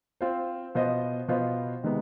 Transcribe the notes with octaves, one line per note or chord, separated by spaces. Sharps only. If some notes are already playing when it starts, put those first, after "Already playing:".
C4 F4 C5
B2 B3 F4 C5 D#5
B2 B3 F4 C5 D#5
C3 D#3 G#3 B3